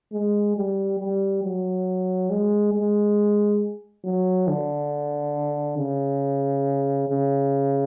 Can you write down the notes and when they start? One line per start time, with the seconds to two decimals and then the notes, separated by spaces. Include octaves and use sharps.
0.13 G#3
0.57 G3
0.99 G3
1.43 F#3
2.30 G#3
2.73 G#3
4.04 F#3
4.48 D3
5.78 C#3
7.09 C#3